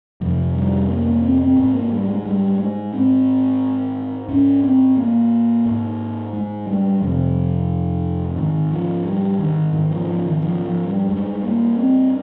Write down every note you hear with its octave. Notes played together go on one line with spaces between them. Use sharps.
F2 C3 F3
G3
A#3
A#3
C4
C4
G#2 C4
A#3
G3
G#3
G3
G#3
G#2 C4
G#2 C#4
C4
A#3
G#2
G#3
G3
F2 C3 F3
G#2 D#3
F3
G3
D#3
G#2 D#3
F3
F3
D#3
F3
F3
G3
G2 G#3
A#3
C4